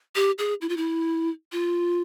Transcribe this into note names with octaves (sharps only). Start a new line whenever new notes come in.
G4
G#4
E4
F4
E4
F4